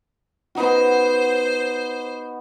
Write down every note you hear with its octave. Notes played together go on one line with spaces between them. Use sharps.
B3 D#4 F#4 C5